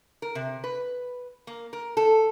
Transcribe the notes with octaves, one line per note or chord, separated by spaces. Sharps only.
A#4
C3
B4
A#3
A#4
A4